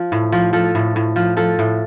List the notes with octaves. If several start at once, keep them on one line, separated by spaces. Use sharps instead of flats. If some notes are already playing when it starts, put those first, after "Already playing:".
Already playing: F3
A2
F3
F3 A4
A2
A2
F3
F3 A4
A2